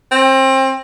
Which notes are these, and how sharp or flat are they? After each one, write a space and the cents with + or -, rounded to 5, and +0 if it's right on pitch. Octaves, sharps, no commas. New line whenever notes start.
C4 +30